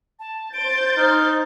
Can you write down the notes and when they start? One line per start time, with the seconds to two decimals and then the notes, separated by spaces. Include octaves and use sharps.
0.19 A5
0.53 C5 G6 A6 D7
0.97 D#4 F6